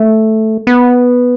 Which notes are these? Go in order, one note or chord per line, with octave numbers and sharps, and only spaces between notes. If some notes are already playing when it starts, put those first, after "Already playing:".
Already playing: A3
B3